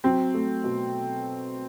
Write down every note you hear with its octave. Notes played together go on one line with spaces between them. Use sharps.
F#3 C4
A3
B2